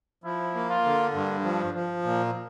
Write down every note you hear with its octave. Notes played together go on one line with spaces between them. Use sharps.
F3 E4
A#3
F4
D3
G2
F3
F3
A#2